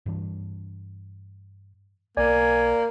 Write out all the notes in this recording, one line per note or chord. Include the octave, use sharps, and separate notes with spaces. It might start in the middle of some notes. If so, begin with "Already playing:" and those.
G2 E3 D4
B1 A#3 D5 G#5